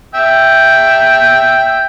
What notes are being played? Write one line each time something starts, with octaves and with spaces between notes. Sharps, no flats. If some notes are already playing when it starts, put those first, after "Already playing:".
E5 G5